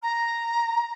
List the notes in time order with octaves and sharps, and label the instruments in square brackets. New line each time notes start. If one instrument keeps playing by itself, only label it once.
[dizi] A#5